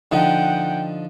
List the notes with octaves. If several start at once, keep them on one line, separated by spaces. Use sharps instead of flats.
D3 F3 D#4 F#5 G5